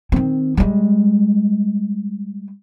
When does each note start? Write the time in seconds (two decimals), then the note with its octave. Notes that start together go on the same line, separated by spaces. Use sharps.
0.12 D#3 C4
0.57 G3 G#3